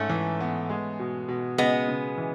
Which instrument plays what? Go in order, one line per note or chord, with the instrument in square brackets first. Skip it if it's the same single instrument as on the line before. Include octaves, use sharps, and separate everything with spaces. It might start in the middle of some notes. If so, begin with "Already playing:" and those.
Already playing: [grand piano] G#2 [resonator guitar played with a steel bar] A3 C#4
[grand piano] E3
B3
G#3
B2
B2
[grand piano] C#3 [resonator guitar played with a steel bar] G#3 B3
[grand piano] C#3
E3